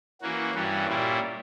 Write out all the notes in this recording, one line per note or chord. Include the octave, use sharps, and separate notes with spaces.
E3 A#3 C#4 F#4
G2 E3 G3 C#4 F#4
A#2 G3 C#4 E4